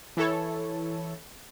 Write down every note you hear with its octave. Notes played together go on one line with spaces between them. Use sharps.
E3 E4 A4 C#5